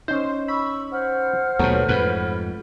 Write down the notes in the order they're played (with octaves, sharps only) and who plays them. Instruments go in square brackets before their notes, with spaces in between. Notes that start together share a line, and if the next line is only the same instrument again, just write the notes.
[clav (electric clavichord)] C#4 D#4 [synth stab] C5
[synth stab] B5 [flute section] C#6 E6
[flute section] C5 F#5 F6
[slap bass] D#2 B2 [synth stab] F#3 B3 F#4 [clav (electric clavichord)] A3
[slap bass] F2 G#2 [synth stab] B4